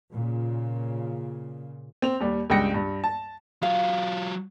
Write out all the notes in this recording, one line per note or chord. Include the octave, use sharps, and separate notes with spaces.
A#2 C#3
C4 F7
D#2 G3
C#2 G2 C#3 G5 A#6 C#7
G2
A5
F#3 F4 F5